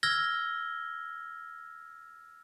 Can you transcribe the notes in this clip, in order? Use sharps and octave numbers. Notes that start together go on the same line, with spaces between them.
E6 F6 G#6 A#6 G7